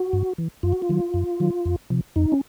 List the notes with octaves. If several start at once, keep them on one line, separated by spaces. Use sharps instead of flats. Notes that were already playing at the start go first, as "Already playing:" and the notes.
Already playing: F#4
G2
E3
F#2 F4
F#4
F4
D#3 F#3
F#2
D#3 F#3
F2
C3 F3
F2 D#4
C#4